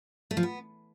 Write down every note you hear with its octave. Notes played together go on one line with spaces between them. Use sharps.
A3
F3
B3